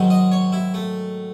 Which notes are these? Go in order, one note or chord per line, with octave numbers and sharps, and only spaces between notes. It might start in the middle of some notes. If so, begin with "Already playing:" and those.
Already playing: G#2 D#3 F#3
D#5
C#5
E4
A3